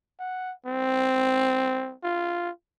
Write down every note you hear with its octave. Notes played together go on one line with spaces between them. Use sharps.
F#5
C4
F4